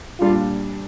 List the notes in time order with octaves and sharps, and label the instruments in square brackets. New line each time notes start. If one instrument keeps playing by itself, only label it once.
[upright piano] A#2 G3 D4 [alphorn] F4